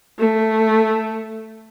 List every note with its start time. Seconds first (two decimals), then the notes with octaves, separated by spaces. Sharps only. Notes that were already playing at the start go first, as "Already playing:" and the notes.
0.19 A3